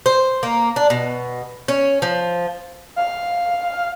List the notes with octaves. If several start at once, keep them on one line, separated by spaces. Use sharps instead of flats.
C5
A#3
D4
B2
C#4
F3
F5